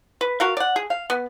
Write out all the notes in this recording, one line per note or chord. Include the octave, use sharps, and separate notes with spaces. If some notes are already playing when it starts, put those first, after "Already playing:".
B4
F#4 A#4 F5
D5 F#5
G#4
F5
B3